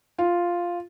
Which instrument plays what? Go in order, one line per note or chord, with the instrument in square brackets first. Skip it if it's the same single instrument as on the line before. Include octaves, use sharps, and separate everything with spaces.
[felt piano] F4